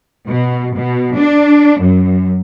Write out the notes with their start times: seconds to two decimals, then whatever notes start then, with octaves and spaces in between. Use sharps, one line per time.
0.28 B2
0.76 B2
1.18 D4
1.81 F#2